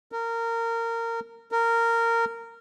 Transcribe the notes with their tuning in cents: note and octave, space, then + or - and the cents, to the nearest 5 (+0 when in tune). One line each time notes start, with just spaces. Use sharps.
A#4 -20
A#4 -15